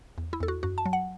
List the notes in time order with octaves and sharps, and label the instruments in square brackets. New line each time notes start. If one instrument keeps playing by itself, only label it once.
[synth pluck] E2
E4
E2 A4
F#4
F#2 F#4
A5
F#3
F#5